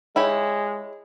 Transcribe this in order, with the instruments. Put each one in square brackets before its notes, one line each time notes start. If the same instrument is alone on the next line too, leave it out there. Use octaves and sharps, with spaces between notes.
[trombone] G#3 [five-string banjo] E4 G4 C#5